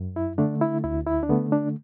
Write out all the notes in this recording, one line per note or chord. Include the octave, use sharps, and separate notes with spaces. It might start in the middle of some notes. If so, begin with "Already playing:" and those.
Already playing: F#2
E4
D3 A3 D4
E4
D2 E4
E4
D4
D3 A3 B3
D4